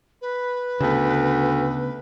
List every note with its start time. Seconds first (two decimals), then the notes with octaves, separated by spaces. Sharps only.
0.22 B4
0.80 D2 C#3 B3